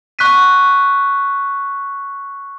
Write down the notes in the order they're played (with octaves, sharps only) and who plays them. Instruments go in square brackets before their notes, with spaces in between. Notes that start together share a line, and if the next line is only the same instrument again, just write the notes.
[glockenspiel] C#6 F#6 B6 D#7